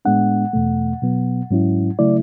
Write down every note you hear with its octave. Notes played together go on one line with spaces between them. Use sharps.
A2 G#3 B3 D4 F#5
E2 B2 A3
B2 F#3 B3
G#2 F#3 C#4 E4
C#3 F#3 A3 E4 D5